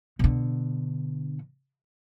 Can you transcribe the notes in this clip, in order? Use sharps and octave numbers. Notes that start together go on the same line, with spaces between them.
B2 D3